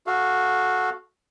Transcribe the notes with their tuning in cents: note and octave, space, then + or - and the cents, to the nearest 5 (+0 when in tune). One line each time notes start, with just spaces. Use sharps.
F#4 -10 A4 -15 F5 +0